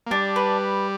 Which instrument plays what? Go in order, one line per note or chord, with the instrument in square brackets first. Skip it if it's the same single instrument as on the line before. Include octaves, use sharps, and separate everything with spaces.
[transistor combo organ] A#3
[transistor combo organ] G3 [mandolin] D4
[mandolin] B4